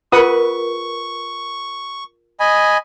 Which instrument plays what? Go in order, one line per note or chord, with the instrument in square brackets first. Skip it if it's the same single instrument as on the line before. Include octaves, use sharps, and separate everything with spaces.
[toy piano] F4 G#4 A#4 [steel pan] B4 F#5 D#6 [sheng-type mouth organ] C#6
[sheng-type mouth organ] D#5 G#5 B5